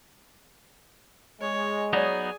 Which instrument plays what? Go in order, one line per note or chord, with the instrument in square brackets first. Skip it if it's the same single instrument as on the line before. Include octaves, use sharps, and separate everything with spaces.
[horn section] G#3 [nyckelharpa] C#5
[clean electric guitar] F#3 B3 D#4 [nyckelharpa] G#4 G#5 [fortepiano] C#5 D5